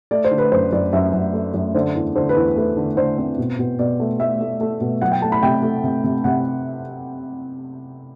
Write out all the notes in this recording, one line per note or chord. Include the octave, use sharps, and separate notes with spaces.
A3 D5
C5
D3
B4
F#2 C5
F#2 D5
F#2 E5
F#2
A3
F#2
D3 C5
E2
D3 C5
B4
E2
A3 B4
D3
D3 C5
C4
B2
B2
B2 D5
A3
A3 E5
A3
A3
B2
F#3 F#5
G5
A3 A5
B5
C3 G5
A3
C3
C3
C3 F#5